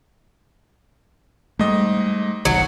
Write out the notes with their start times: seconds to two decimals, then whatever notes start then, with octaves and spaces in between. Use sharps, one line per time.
1.59 G#2 G3 A3 D#5
2.45 F#1 B1 D#3 F#3 F#4